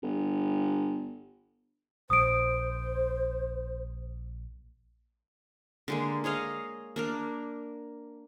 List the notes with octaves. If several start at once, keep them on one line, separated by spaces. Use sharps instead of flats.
G1
A#1 C5 D#6 D7
D3 G#3 A#3
G#4 C#5 D#5 F5
A#3 D4 A#4